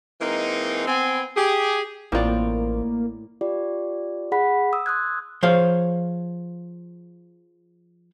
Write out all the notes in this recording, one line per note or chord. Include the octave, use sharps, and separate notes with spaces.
E3 G#3 A#3 C4 D#4
B3 C4 G#5
G4 G#4
A1 A2 A#3 C4 F4 D5
F4 G4 D5
G#4 F#5 B5 B6
D#6 E6
C6 D#6 E6 F#6 G#6
F3 G#4 C5 C#5 F5